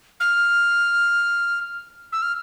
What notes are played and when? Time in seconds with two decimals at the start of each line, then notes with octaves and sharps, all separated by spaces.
0.20 F6
2.12 E6
2.22 F6